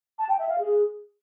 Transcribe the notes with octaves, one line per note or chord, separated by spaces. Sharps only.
A5
G5
E5
F5
G#4